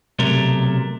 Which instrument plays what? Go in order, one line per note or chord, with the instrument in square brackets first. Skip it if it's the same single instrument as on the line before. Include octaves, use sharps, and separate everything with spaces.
[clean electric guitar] B1 C3 F#3 A3 A#4